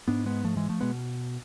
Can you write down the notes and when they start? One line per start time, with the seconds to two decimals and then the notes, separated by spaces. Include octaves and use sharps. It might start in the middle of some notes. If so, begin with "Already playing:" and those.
0.08 G#2 B3 D4
0.26 G#3 B3
0.44 F3 A3
0.57 E3 G#3
0.69 F3 A3
0.81 B2 G#3 B3